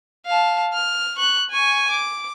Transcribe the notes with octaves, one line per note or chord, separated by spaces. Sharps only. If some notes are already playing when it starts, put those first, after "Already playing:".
F5 A5
F6
C#6 F#6
G#5 C#6
D6